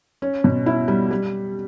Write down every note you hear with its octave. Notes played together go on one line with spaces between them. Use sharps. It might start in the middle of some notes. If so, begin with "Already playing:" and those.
C#4
B2
E4
G3
G3